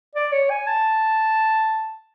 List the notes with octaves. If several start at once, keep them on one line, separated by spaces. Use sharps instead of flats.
D5
C#5
G#5
A5